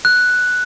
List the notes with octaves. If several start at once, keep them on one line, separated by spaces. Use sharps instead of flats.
F#6